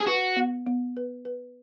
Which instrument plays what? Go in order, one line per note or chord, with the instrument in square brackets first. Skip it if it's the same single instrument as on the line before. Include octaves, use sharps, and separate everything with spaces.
[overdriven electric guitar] G#4
[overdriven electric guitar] F#4 [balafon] B4
[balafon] B3
B3
B4
B4